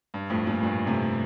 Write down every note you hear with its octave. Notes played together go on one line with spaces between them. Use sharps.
G2
F2 A2
G2 A#2
G2 A#2
A2 C3